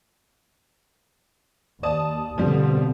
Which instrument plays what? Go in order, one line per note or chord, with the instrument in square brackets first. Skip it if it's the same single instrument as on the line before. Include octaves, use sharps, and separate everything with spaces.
[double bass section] D#2 [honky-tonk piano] D5 A5 D#6
[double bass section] B2 D3 C4 [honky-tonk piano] F3 G3